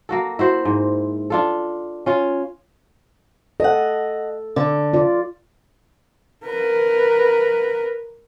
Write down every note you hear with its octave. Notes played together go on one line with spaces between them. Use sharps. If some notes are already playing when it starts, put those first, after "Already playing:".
A#3 F#4 A4
E4 F#4 C5
G#2
D4 F4 A4
C#4 F4 C#5
A4 D#5 F#5
D3
F4 D5
A#4 B4